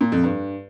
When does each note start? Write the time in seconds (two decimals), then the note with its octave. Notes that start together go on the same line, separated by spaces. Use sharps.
0.01 A#2
0.12 F2
0.23 G2